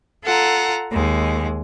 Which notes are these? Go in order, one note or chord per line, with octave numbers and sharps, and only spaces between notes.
F4 A4 F#5 A#5
D#2 G#3